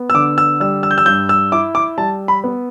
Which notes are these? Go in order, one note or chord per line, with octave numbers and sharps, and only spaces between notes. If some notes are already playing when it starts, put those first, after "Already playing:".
Already playing: B3
E6
D3 D6
E6
G3 E6
E6
G6
E6
G2 G6
E6
E4 D6
D6
G3 A5
B5
B3